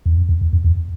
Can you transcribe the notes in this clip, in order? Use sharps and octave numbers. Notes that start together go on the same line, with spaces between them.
E2
F2
E2
E2
F2
E2